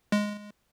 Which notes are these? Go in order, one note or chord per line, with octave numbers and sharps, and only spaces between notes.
G#3